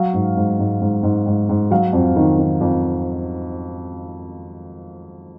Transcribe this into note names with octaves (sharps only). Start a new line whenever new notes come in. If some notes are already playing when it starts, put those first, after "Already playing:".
Already playing: F#3 F5
G#2
G#2
G#2
G#2
G#2
G#2
G#2
F#3 F5
F2
D#3
D#3
F2